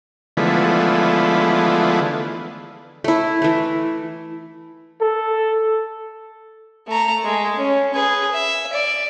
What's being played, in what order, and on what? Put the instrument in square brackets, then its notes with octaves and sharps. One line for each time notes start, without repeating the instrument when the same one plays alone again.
[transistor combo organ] D3 E3 F3 G#3 A3 B3
[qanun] A3 E4
E3 A3
[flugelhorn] A4
[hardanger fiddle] A3 A#5
G#3 A3
C#4
G#4 B4
E5
D5